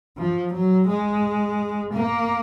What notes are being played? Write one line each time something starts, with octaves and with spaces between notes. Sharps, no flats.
F3
F#3
G#3
A#3